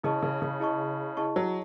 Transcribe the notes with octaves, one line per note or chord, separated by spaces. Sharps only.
C#3 E4 G#4 D#5 A5 C#6
C#3
C#3
E4 G#4 D#5 A5 C#6
E4 G#4 D#5 A5 C#6
F#3